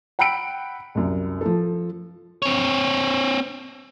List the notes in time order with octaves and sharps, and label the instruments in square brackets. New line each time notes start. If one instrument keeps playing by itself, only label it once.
[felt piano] F#5 G5 B5 E6 C#7 D7
C2 F#2
F3 A4
[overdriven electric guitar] C4 C#5